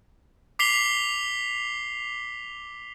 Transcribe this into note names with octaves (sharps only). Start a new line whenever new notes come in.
D6 B6 C7 F7 G7